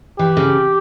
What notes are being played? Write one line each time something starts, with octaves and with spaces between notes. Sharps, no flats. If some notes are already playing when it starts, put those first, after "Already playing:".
E3 G4
C#3